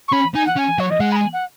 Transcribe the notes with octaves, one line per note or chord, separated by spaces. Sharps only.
C#6
C#4 B5
D#4 G#5
F#5
C#4 G#5
F#3 C#5
D#5
G#3 F#5
B5
G#5
F#5